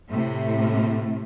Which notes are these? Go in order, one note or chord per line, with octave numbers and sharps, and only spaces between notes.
A2 C3